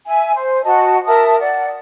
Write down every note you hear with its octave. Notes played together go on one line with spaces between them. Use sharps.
E5 G#5
C5
F#4 D#5 A5
A#4 E5 A5 D#6
D5 F#5